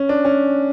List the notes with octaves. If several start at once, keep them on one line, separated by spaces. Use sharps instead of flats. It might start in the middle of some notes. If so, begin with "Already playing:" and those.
Already playing: C#4
D4
C#4